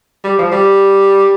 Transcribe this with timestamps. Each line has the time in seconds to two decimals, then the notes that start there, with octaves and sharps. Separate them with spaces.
0.24 G3
0.39 F3
0.52 G3